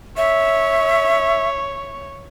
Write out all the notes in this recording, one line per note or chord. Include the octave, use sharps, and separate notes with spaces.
C#5 E5